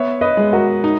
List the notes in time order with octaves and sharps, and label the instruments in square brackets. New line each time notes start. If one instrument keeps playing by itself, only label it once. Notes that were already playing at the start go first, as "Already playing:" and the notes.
Already playing: [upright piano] B3 [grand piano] C#5 E5
[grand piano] B4 D#5
[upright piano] G#3
[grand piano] F#4 A#4
[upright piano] D#4